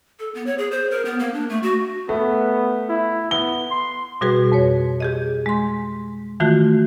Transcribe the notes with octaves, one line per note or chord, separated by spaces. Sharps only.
A4
B3
C#5
G#4
C5
A#4
B3
A#3
D4
A3
F#4
A3 B3
E4
B3 G7
C6
B2 G3 F#4 G#4 B4
F2 B4 C#5
G4 G#4 D#5
G#3 C6
D#3 E3 A3 F4 F#4